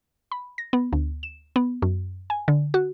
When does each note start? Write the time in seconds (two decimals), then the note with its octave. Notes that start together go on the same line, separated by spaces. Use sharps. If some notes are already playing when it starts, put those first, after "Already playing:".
0.32 B5
0.58 A#6
0.73 B3
0.93 D2
1.23 E7
1.56 B3
1.82 F#2
2.30 G#5
2.48 D3
2.74 F#4